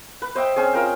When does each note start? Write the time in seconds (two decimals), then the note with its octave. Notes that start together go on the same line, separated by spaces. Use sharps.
0.22 B4
0.35 C5 D#5 E5 G5
0.56 C4 C#4 G#4
0.73 F4 A#4 G5